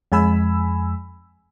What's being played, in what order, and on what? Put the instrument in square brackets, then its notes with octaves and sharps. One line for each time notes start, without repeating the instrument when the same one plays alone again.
[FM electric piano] F2 G#3 G#5 B5 E6